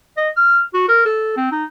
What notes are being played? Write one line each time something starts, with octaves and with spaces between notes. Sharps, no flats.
D#5
F6
F#4
A#4
A4
C4
D#4